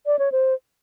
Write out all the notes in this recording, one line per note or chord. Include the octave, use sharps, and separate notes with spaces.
D5
C#5
C5